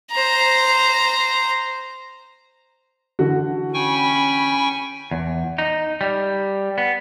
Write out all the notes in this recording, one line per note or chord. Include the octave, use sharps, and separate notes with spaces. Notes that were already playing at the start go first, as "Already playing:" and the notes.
C5 A#5
D3 E3 F#4
C#4 G5 G#5 B5 C#6
E2
D#4
G3
B3